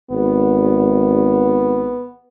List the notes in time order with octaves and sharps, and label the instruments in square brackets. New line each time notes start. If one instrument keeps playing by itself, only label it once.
[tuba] G#1 [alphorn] B3